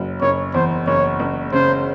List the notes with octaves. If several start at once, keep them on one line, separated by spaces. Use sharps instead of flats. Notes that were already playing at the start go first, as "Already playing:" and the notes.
Already playing: F#1 F#3
F#1 C#5
E2 C5
F#1 C#5
F#1
C#3 C5